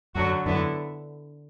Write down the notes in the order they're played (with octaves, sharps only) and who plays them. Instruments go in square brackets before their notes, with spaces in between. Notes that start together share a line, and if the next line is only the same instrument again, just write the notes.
[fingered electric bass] F#2 [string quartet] D3 F#3 A3 F#4
[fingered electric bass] F#2 [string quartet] D3 B3 E4